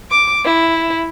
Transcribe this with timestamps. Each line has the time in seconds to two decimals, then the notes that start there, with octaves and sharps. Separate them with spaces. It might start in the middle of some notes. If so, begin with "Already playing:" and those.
0.11 D6
0.45 E4